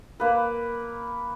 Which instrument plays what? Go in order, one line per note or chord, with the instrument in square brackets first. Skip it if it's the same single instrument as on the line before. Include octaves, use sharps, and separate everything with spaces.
[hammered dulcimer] A#3 B4